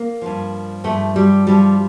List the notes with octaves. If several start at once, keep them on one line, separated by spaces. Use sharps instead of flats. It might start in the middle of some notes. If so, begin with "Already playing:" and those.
Already playing: A#3
G2 F3
G2 F3 A3
G3
G2 F3 G3